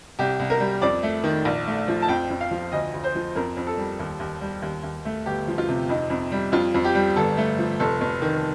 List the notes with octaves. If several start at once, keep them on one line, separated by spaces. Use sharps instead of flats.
C2 G4
C2
A#4
G3
F2 D5
A3
D#3
A#1
A3
F3
A5
F2 G5
F2
F5
F3
D2 D#5
D2
C5
F3
F2 A#4
F2
A4
G3
D#2
D#2
G3
D#2
D#2
A3
G1 G4
F3
F4
C3
F2 D#4
F2
G3
F2 F4
F2
G4
G3
G1 A4
A3
F3
F1 A4
F1
D#3